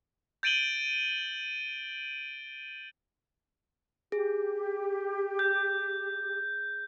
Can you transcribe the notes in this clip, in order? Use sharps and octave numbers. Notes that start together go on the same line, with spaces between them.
G6 A6 D7 D#7 F#7 G7
G4 G#4
G6